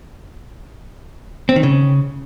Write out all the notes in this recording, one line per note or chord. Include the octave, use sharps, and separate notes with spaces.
C4
D#3
C#3